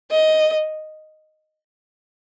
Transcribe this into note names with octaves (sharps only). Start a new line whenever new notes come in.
D#5